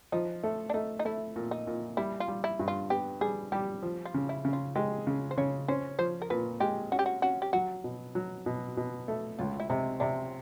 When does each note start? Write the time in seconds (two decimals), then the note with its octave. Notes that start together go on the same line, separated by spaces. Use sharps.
0.12 F3 D#4
0.43 A3
0.69 D4
0.74 A3 D#4
0.99 D#4
1.05 A3 E4
1.36 A#2
1.51 D#4
1.67 A#2
1.97 G3 E4
2.20 F4
2.28 G3
2.44 E4
2.59 G2
2.68 F4
2.90 B3 G4
3.21 G3 G#4
3.52 G3 G4
3.83 F3
4.05 F4
4.14 C#3
4.29 E4
4.45 C#3
4.53 F4
4.75 G#3 G4
5.07 C#3
5.31 C5
5.37 C#3 C#5
5.68 C#4 C5
5.99 F3 C5
6.22 A#4
6.30 A#2 B4
6.60 G#3 G4
6.92 C#4 F#4
6.99 G4
7.06 F#4
7.22 C#4 F#4
7.42 G4
7.53 F#3 F#4
7.84 B2
8.15 F#3
8.46 B2
8.77 B2
9.08 A3
9.39 C#2 F4
9.60 E4
9.70 C3 D#4
10.00 C3 D4